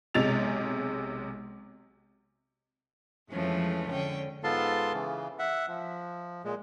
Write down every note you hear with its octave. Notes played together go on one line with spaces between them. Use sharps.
B1 C3 G#3 A6 F7
F2 E3 F3 G#3 A3 C#4
D3 C#4 G5
G#2 B3 F4 A4 A5 C6
C#3 E3
E5 F#5
F3
A#2 G#3